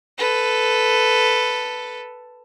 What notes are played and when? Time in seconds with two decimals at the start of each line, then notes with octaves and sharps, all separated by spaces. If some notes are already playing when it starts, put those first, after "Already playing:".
0.18 A4 B4